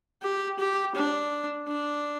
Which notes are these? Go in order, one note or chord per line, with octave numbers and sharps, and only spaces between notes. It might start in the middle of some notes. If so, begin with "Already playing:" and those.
G4
G4
D4
D4